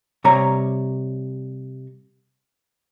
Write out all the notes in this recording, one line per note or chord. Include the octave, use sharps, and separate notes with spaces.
C3 G3 C#5 A#5